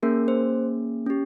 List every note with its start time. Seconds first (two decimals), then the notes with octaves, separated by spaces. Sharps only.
0.03 A#3 C#4 G#4 A#4
0.28 C5
1.06 C#4 G4